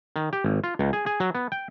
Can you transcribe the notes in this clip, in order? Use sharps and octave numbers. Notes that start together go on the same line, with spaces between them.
D#3
G4
G#1
F4
C#2
G#4
G#4
F#3
B3
G5